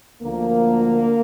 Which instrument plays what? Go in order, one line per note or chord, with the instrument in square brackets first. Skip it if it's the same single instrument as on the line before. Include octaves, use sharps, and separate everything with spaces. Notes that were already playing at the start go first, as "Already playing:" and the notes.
[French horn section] D2 D3 F3 A#3